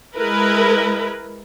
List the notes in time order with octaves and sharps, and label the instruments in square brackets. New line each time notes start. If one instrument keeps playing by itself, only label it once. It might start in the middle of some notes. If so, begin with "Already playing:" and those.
[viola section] G#3 E4 A#4 B4